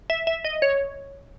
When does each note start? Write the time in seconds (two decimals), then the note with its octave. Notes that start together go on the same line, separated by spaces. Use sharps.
0.10 E5
0.27 E5
0.44 D#5
0.62 C#5